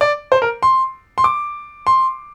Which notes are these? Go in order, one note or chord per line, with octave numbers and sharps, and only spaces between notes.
D5
C5
A#4
C6
C6
D6
C6